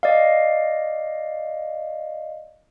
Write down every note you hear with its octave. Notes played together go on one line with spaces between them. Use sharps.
D5 D#5 F5